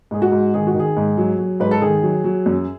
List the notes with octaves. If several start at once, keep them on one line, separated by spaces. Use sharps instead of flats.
G#2 G#4
F#4
G#2
D#3 G#4
F#4
D#3 G#4
G#2
F#3
F#3
G#2 B4
A4
D#3 G#4
F#3
F#3
F#2